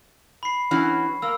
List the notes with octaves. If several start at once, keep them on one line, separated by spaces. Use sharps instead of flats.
B5 C7
E3 C#4 F#4
A#3 E6